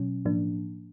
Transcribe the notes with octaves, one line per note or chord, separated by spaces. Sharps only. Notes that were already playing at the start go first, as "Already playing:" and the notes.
Already playing: B2 F#3 C#4
A2 F3 A#3 D4